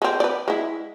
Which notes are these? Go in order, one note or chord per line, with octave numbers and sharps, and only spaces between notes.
G#3 C4
B4 D5
G#3 E4